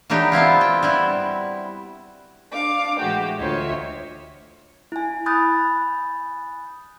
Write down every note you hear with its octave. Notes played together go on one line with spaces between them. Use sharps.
E3 F#3 D4 D#4 G4
B3 C4 E4 F4
G5
G3 E4 F#4
D4 F5 D6
A2 E3 G#3 F#4 G4
D2 F4 C#5 D#5 E5
E4 G#5
G#5 B5 D#6 F#6 G6 A6